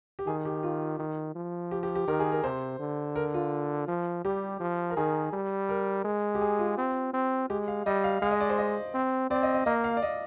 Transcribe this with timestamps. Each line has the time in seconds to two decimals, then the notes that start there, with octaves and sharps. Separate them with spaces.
0.19 G4
0.27 D#3 G#4
0.45 G4
0.63 F4
0.99 D#3
1.36 F3
1.71 G4
1.83 G4
1.95 G4
2.08 D#3 A#4
2.20 G#4
2.32 A#4
2.44 C3 C5
2.80 D3
3.16 A#4
3.34 F4
3.88 F3
4.25 G3 G4
4.60 F3
4.90 A#4
4.97 D#3 G#4
5.33 G3
5.69 A#4
6.05 G#3
6.35 G4
6.42 G#4
6.59 F4
6.78 C4
7.14 C4
7.50 G#3 G4
7.68 F5
7.86 G3 D#5
8.04 F5
8.22 G#3 F5
8.31 D#5
8.40 D5
8.49 C5
8.58 D#5
8.94 C4
9.30 C4 D5
9.43 D#5
9.54 D#5
9.66 A#3 D#5
9.84 F5
9.97 D5
10.02 D#5